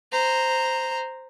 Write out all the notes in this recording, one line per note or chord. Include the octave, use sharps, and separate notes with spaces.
C5 A#5